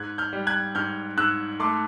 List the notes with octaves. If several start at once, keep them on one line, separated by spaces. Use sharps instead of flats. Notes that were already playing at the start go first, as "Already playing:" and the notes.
Already playing: G#2 F#6 G#6
F6 G6
G3
F#6 G#6
G#2 F6 G6
G#2 E6 F#6
A3 C6 D6